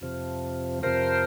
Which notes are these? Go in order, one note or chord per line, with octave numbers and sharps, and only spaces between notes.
F2 C3 F3
F2 C3 F3 A#4 C5